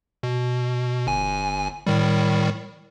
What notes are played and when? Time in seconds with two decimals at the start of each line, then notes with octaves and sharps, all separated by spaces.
0.23 B2
1.07 G1 G#5
1.87 A2 D#3 G3